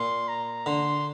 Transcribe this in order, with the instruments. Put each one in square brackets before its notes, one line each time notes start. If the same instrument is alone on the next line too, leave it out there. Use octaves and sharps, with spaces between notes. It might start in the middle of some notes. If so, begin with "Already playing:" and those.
Already playing: [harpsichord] A#2 [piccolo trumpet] C6
[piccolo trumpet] A#5
[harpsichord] D3 [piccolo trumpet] C6